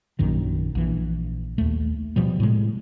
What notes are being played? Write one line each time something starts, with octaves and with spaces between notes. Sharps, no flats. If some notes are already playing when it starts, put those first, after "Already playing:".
A#1 F#2 D#3
A#1 E3
D#2 A3
B2 F3 G3
A2 C3 G#3